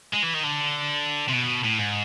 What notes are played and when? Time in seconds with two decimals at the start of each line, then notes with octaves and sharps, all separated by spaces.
0.14 G#3
0.23 E3
0.35 D#3
0.44 D3
1.28 C3
1.33 B2
1.64 A2
1.78 G#2